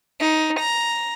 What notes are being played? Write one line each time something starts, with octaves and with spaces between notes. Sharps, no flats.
D#4
A#5